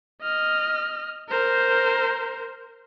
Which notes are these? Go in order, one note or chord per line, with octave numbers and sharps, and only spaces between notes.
D#5 F6
A#4 C5